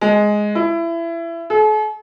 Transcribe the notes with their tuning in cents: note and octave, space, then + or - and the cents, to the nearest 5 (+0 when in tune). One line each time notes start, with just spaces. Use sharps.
G#3 +5
E4 +25
A4 -45